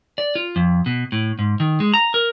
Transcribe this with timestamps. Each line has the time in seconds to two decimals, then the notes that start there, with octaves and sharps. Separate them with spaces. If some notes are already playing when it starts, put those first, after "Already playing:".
0.18 D5
0.35 F4
0.56 F2
0.86 B2
1.12 A2
1.39 G#2
1.60 D#3
1.80 G#3
1.94 A#5
2.14 A#4